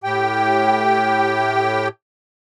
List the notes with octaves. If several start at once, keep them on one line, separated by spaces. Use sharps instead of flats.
A2 G4 G5